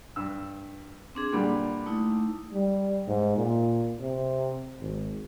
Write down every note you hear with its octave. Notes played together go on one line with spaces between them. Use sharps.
G2 E6
C4 D4 G#4
A#2 D3 G3 B5
A3 D#4 E4
G3
G#2
A#2
C3
G#1